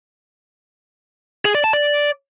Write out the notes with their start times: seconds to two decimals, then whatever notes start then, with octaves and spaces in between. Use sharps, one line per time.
1.45 G#4
1.55 D5
1.64 A5
1.73 D5